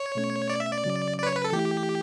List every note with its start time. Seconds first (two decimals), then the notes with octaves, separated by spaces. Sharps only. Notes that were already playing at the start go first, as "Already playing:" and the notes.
Already playing: C#5
0.15 B2 A3 C#4
0.50 D5
0.60 E5
0.72 D5
0.84 C#3 F#3 C#4
1.18 D5
1.23 B4
1.27 C#5
1.36 B4
1.44 A4
1.52 E3 A3 E4 G4